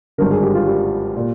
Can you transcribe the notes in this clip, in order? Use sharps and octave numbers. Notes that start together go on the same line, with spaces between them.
G#1 G2 D3 A#4
G#4
G4
F4
G3
A#2